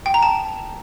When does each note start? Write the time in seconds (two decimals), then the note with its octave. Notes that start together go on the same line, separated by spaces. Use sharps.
0.06 G5
0.14 A#5
0.23 A5